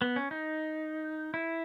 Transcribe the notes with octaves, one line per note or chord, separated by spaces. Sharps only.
B3
C#4
D#4
E4